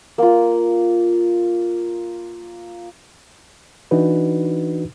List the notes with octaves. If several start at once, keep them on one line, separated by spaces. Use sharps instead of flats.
A#3 F4
E3 D4 D#4 F#4 B4